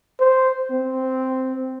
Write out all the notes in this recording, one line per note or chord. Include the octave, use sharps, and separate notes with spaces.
C5
C4